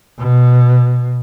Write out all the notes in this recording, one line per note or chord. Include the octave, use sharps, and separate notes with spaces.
B2